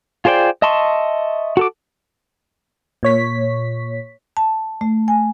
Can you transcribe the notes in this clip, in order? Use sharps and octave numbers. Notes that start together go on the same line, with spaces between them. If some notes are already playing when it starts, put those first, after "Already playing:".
F4 G#4 C5 D5 G5
D#5 E5 A5 C6 C#6
F#4 A4 D6
A#2 C#5 B6
A5
A3
G#5